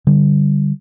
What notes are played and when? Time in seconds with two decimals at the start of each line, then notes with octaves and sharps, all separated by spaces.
0.07 D3 G3